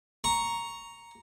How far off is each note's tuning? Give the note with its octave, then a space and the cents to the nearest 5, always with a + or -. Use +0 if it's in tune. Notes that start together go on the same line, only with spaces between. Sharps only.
A#5 +0 C#6 +0